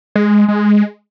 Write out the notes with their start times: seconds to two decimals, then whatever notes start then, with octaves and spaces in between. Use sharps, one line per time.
0.16 G#3
0.48 G#3